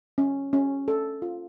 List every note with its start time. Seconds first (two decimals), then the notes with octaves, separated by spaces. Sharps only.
0.18 C#4
0.53 C#4
0.88 A4
1.22 F4